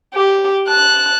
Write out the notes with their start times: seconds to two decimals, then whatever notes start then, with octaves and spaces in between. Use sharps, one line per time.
0.14 G4
0.69 A5 F#6